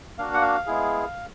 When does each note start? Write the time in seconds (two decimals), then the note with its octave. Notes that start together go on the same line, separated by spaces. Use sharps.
0.18 A#3 D4 F#4 F5
0.34 F#5
0.42 F5
0.66 G#3 B3 E4 G#4